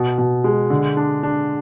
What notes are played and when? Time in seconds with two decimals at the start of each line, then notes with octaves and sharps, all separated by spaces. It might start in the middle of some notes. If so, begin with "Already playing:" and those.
Already playing: B2
0.18 B2
0.44 G#3
0.70 D3
0.97 D4
1.23 D4